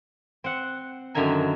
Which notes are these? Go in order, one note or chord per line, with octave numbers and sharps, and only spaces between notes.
C4 F#5
F#2 D3 D#3 E5 G#5 A#5